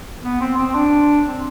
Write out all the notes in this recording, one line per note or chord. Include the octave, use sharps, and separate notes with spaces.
B3
C4
C4
D4
C4